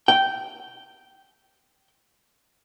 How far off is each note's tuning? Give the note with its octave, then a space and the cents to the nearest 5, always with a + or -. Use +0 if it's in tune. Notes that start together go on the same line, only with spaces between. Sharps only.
G5 -10